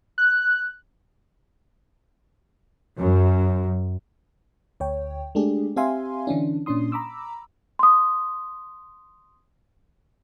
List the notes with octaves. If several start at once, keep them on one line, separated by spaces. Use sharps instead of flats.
F#6
F#2
D2 C#5 G5
G#3 A3 D4 G4 G#4
C4 G4 E5 F5 G#5 C6
D3 E3 C#4 D4
A#2 C#4 D4 C6 D#6
A#5 B5 D6 E6
C6 D#6